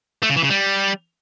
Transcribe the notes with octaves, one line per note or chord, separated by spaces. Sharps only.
A3
C#3
E3
C#3
G3